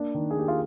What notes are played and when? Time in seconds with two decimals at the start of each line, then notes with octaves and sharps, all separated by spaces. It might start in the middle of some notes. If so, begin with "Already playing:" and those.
Already playing: A#3 D4
0.14 D#3
0.31 G#4
0.35 A#3 G4
0.48 F4